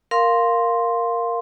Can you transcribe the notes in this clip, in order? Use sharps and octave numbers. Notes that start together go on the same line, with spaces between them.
A#4 F5 C6